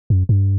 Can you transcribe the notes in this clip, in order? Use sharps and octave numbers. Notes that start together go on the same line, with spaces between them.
F#2
G2